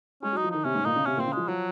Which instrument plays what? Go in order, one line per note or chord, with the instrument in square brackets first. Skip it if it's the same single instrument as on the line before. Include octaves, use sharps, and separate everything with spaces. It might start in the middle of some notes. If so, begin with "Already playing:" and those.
[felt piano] G#3 [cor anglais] C#4
[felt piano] F#3
[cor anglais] D#4
[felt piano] F3
[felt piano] D#3 [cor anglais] D#4
[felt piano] C3 [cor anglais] C#4
[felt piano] G#2
[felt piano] A#2 [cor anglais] D#4
[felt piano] C#3
[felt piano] C3 [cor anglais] C#4
[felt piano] A#2
[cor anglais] C4
[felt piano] C#3
[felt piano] F3 [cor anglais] G#3
[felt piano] F3 [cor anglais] F#3